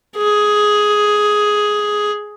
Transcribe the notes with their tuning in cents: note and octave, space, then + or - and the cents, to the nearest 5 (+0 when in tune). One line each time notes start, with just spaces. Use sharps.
G#4 +5